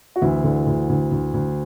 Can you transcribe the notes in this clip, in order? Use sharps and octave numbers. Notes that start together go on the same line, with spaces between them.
F#4
D2 E3 E4
D3
D2
D2
D2
D2